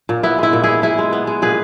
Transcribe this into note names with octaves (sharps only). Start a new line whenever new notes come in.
A#2
B3 E4
G#3 E4
A#2
B3 E4 G#4
A#2 E4 G#4
G#3
B3
G#3
A#2 G#4 B4